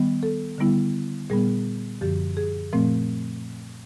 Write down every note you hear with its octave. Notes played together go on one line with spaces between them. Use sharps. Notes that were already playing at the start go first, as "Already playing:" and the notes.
Already playing: D#3 G3 B3
A4
D3 G3 B3 E4
A#2 G3 B3 G#4
F#2 D3 F3 G4
G#4
A#2 F3 A3 C4